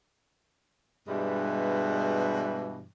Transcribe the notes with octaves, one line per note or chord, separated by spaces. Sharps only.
G2 B2 E3 G3 G#3